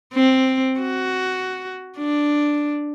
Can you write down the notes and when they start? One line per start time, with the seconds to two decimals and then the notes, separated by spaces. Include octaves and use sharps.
0.13 C4
0.80 F#4
1.98 D4